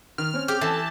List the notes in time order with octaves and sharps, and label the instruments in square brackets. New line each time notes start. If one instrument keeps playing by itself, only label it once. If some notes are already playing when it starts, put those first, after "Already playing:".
[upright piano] D#3 [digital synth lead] F6
[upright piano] C4 C#4
[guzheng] G4 [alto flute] G#4 [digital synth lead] F6
[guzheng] E3 [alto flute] A4 [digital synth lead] A5